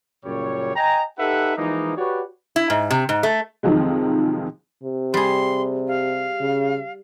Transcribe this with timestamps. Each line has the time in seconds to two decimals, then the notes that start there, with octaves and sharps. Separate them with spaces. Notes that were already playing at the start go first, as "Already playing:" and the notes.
0.24 F#2 A#2 C#3 G3 C#5
0.75 D#5 G5 G#5 A#5
1.19 D#4 G4 A4 B4 E5 F#5
1.57 E3 F3 G#3 A#3 D#4
1.97 F#4 G4 B4 C#5 D5
2.56 E4
2.70 G#2
2.91 C3
3.09 G#2
3.23 A3
3.63 F2 C3 D#3 F3 F#3 G#3
4.84 C3
5.14 G3 G#4 C6
5.88 F5
6.40 C#3